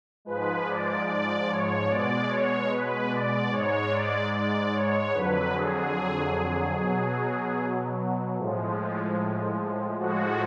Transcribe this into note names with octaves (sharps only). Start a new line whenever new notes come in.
G#2 F3 G#3 B4
D5
D5
C#5
B2 G#3 D5
C#5
B4
D5
G#2 G#3 C#5
D5
D5
C#5
F2 D3 F#3 B4
G#4
B2 F#3
A2 F3 G#3
A2 F3 G#3 F#4